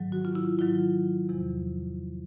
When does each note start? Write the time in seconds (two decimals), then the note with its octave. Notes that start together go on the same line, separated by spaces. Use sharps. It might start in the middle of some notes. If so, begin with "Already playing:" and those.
Already playing: G#2 D#3 F#3
0.12 F#4
0.25 F4
0.35 E4
0.59 G#2 D#3 F#3 F4
1.29 E2 C3 F3